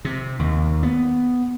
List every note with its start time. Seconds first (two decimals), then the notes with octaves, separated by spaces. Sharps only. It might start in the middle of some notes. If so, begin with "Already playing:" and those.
0.05 C3
0.39 D#2
0.83 B3